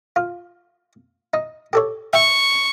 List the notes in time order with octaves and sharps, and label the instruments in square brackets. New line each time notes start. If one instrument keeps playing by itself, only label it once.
[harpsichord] F4
D#4
G4 A4 C#5
[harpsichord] E5 G5 [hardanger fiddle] C#6